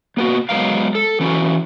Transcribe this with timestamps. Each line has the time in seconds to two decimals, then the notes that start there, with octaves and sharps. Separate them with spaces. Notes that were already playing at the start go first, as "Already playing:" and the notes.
0.17 A#3 B3 F#4
0.49 F#3 G#3 B3 A#4 F5
0.95 A4
1.20 E3 C#4 F#4